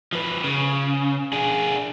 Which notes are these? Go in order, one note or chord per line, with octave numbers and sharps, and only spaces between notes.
F3 B4
C#3
D4 G#4